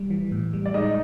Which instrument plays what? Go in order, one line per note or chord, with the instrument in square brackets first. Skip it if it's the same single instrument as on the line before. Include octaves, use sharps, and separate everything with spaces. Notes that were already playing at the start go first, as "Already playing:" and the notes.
Already playing: [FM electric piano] G3
E3
A2
G3
[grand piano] D5
[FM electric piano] G#3 [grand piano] D#4 D#5